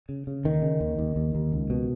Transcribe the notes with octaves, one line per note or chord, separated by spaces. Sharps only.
C#3
C#3
D#2 D#3
C#3
D#2
D#2
D#2
D#2
C#2
B2